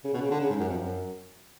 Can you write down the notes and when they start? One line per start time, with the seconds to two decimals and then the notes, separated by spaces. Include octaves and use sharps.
0.04 C#3
0.13 B2
0.22 C#3
0.31 D3
0.40 C#3
0.50 G#2
0.60 F#2
0.69 F2
0.78 F#2